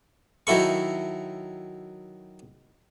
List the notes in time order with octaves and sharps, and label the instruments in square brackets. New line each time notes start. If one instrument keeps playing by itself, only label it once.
[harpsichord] D#3 F#3 E4 A4 C#6